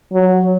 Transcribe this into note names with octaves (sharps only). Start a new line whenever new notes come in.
F#3